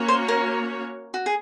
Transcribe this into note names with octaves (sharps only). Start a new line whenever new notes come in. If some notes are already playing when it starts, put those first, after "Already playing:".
Already playing: A#3 C#4 F#4 C#5
C5
A#4
F#4
G#4